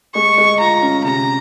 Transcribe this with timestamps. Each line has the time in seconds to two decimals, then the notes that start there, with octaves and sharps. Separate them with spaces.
0.15 G#3 C#6
0.38 G#3
0.60 F4 A#5
0.82 C#4
1.04 C3 A#5